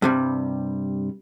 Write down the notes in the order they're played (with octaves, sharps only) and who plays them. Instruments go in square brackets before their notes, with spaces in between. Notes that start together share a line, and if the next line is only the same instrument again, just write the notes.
[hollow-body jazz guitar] G2 C3 G3